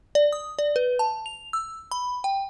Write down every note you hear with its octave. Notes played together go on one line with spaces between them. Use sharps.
D5
D#6
D5
B4
A5
F7
E6
B5
G5